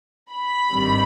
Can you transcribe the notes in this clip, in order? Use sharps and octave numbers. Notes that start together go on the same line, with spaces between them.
B5
G#1 G2 D#3 G3 C4